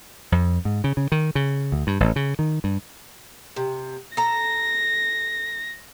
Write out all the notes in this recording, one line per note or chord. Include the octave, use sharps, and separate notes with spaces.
F2
G#2
C#3
C#3
D#3
C#3
D2
G2
A1
C#3
D#3
G2
C3
A4 A#5 A#6